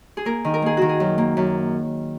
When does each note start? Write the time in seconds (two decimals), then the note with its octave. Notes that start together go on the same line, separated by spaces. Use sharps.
0.17 G#4
0.25 A#3 A#4
0.45 D#3
0.54 A#4
0.62 A#3 G#4
0.77 D#3 F#4
0.89 G#4
1.00 F#2
1.18 A#3
1.37 F#2